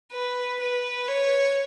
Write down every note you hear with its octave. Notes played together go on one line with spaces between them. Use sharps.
B4
B4
C#5